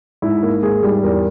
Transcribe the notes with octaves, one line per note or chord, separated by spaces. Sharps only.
G#2 E4
A#3
G#2 G#4
G3
E2 A#4